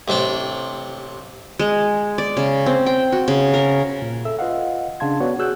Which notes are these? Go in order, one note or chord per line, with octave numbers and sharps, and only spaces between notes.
A1 C3 D4 G5
G#3
D5
C#3
C4
G5
F#4
C#3
A#4
A#2
A4 E5 E6
F4 B4 D#5 F5 F#5
C#3 D4 F5 A5 C6 G#6
B3 F#4 C#5 D5
F#4 G#4 E6 F#6 G6